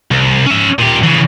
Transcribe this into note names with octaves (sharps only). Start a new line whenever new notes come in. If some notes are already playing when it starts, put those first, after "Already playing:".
C2
C#4 E5
A#2 G4
C#3 E3